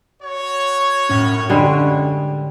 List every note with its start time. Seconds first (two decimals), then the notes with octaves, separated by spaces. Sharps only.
0.22 F#4 C#5
1.09 F#2 A2 C#4
1.50 D3 G3 G#3